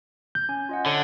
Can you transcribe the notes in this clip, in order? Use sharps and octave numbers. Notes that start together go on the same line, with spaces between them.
G6
C#4 G#5
F4 D#5 F#5
D3 C#5